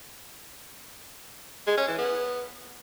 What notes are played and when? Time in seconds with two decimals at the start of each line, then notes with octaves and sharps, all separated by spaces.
1.67 G#3
1.77 C#4
1.88 E3
1.98 B3